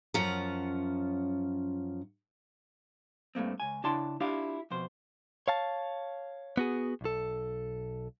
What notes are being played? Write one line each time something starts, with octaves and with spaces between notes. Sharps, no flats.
F#2 F3 C#4 F4 F#5 A#5
G2 A3 A#3 C4
C#2 G#5
C#3 D4 E4 G5 A5 C6
D4 E4 F4 G4 F5
F2 B2 C5
C#5 F5 A5
B3 F#4 G#4
B1 A4